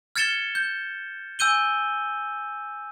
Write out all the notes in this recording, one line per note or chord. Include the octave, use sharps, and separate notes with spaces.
F6 G#6 A6 C#7 E7 G7
G6
G#5 E6 G6 D#7 G7